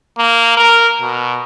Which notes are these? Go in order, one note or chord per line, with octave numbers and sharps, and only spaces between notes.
A#3
A#4
B2